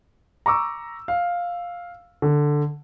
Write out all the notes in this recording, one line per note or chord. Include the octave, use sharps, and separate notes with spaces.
A#5 C#6 D6 E6
F5
D3